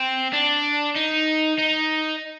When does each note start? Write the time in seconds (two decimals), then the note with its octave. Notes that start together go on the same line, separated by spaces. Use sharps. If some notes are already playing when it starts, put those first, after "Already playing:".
Already playing: C4
0.33 D4
0.96 D#4
1.58 D#4